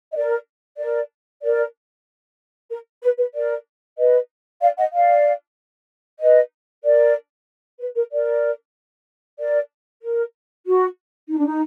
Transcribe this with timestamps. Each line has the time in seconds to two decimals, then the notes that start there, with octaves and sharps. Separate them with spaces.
0.11 D#5
0.16 A#4 D5
0.79 A#4 D5
1.43 A#4 D5
2.71 A#4
3.02 B4
3.18 B4
3.34 A#4 D5
3.98 B4 D#5
4.62 D5 F5
4.78 D#5 F#5
4.93 D5 F5
6.21 B4 D#5
6.84 A#4 D5
7.80 B4
7.96 A#4
8.11 A#4 D5
9.39 A#4 D5
10.03 A#4
10.66 F#4
11.30 D#4
11.38 D4
11.46 D#4